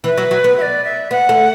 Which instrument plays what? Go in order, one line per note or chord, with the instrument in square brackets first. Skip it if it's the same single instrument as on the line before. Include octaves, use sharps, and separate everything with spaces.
[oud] E3 [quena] B4
[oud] F#3
F#3
B3
[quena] E5
D5
E5
[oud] B3 [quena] F#5
[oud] A3